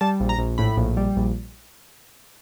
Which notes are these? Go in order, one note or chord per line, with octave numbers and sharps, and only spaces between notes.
G3 A5
A#1
A#5
A#1
A2 B5
A#1
G3
A#1